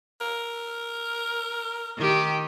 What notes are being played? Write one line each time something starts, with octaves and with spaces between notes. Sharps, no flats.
A#4
D#3 G4